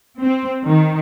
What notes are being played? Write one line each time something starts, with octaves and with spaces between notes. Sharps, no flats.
C4
D#3